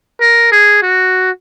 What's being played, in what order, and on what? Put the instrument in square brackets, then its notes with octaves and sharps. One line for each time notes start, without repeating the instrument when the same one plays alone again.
[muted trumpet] A#4
G#4
F#4